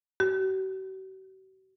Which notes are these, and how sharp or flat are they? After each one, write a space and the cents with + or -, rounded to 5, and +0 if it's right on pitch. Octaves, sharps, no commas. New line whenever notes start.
F#4 +45